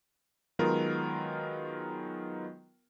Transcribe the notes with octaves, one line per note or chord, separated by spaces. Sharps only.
D#3 F#3 G#3 B3 F4 A#4